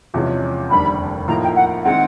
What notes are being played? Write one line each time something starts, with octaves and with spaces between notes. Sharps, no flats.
E2 C3 F3 G#3 C#4
F1 D#2 D3 G3 B5
A2 F3 A#3 D#4 A#5
G5
F#5
D#3 G#3 C4 F#5